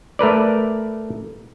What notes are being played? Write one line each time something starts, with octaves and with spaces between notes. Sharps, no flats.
A3 A#4 B4 D5